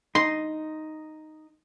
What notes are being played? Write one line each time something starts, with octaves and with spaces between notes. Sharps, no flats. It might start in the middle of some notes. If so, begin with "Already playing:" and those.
D#4 C6